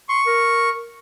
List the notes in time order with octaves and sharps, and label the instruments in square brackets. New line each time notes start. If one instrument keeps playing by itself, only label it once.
[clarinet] C6 [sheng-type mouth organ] C#6
[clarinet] A#4